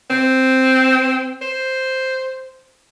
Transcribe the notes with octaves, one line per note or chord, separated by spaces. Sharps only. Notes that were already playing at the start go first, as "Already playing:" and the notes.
C4
C5